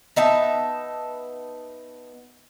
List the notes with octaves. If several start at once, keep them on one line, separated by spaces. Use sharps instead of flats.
B3 D#4 E5 A5